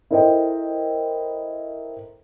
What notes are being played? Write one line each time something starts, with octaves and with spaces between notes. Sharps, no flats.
E4 A4 A#4 C5 D#5 G5